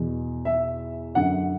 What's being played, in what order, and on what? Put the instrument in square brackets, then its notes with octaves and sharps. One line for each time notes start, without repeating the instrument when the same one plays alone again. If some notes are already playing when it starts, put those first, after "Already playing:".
Already playing: [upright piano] E2 B2
E5
F#2 D3 F#5